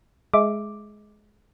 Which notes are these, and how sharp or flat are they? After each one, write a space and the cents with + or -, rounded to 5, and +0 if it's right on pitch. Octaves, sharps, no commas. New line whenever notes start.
G#3 +15 E5 +0 D6 +0